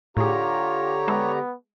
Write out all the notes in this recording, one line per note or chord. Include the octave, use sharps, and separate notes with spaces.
A2 D3 F4 G4 G#4 C#5 A#5
G#3 B3 E4 A4